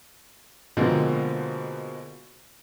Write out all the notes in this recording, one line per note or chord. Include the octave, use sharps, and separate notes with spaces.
B2 D3 F3 G#3 A#3 C4